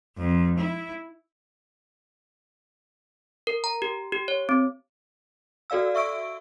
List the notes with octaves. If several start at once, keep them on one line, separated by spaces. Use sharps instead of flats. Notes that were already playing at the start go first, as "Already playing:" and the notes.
F2
E4
A#4
A#5
G4
G4
C#5
C4
F#4 A4 D5 F5 E6
E5 C#6 E6 D7